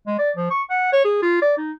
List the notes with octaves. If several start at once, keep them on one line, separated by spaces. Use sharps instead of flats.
G#3
D5
F3
C#6
F#5
C#5
G#4
F4
D5
D#4